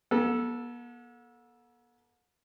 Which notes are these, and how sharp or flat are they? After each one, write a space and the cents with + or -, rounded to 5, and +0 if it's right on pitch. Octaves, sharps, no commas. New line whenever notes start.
B3 -45 A4 +0